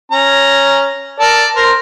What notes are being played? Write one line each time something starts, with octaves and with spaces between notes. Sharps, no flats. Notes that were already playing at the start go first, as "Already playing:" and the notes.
C#4 A#5
A4 A#4 D5
A#4 C5